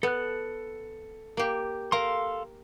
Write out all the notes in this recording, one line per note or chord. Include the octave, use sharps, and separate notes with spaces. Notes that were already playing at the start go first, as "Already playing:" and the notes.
B3 A4 F#6
A#3 G4
A4 A#4 F5 A#5 C6